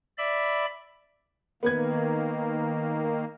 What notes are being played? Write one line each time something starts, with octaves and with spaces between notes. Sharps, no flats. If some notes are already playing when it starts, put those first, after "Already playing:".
D5 E5 B5
D#3 A#3 B3 B4 G#6